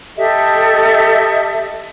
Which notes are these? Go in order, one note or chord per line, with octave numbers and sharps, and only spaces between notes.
G4 A4 D#5 E5